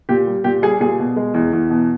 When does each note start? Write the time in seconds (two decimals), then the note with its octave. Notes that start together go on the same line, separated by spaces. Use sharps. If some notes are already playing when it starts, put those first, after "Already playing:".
0.09 A#2 G4
0.27 G3
0.44 A#2 G4
0.62 G3 G#4
0.80 A#2 G#4
0.99 B2
1.16 G#3
1.34 E2
1.53 E2
1.70 B2